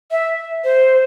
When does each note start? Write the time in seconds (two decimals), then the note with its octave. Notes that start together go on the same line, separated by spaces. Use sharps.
0.11 E5
0.64 C5